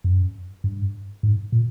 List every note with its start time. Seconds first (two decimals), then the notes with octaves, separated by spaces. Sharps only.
0.04 F#2
0.64 G2
1.23 G#2
1.52 A#2